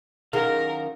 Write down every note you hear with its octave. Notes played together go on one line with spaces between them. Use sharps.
F#2 D#3 G#4 A#4 F5 F#5